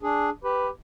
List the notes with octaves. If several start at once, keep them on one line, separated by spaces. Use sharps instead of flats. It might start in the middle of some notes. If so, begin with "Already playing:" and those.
D4 G#4
G4 B4